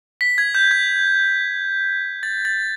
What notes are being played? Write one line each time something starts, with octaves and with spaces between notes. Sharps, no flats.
B6
G#6
G6
G#6
A6
A6